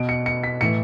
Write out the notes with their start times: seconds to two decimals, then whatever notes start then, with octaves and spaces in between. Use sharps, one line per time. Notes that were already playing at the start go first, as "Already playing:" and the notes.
Already playing: B2 D7
0.09 C#7
0.26 C#7
0.44 B6
0.61 A2 E3 C#7